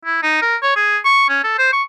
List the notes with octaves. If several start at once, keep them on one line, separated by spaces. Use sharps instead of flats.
E4
D#4
A#4
C#5
G#4
C#6
C#4
A4
C5
C#6